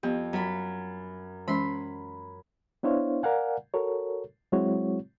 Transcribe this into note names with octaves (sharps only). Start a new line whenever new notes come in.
F2 B3 G4
F#2 B5
E3 G#3 C#4 B5 C6
B3 D4 E4 C5 C#5 F5
A#4 D5 F5 F#5 G#5
F#4 A4 A#4 C#5
F#3 G#3 C4 E4 F#4 C#5